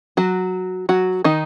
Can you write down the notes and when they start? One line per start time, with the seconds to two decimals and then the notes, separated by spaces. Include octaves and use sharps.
0.17 F#3 F#4
0.89 F#3 F#4
1.24 D#3 D#4